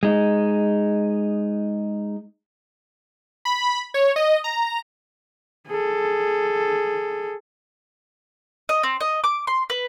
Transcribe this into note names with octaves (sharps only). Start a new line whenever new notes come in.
G#3 D#4
B5
C#5
D#5
A#5
G#4 A4
D#5
C4
D#5
D6
C6
B4